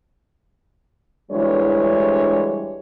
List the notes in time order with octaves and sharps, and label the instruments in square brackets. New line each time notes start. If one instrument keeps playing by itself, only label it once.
[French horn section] D2 E3 G3 G#3 D4 C#5